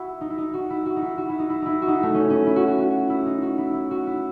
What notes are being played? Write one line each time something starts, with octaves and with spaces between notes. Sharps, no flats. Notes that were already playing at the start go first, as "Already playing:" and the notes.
Already playing: E4 F#4
D#4
E4
D#4
F#4
E4
F#4
D#4
E4
F#4
E4
D#4
E4
D#4 E4
F#4
D#4
E4
A3
C#4
C#4
E4
F#4
F#4
F#4
E4
D#4
F#4
E4
E4
F#4
E4